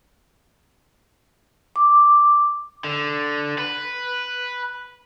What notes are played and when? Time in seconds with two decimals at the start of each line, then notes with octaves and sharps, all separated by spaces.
1.76 D6
2.84 D3
3.58 B4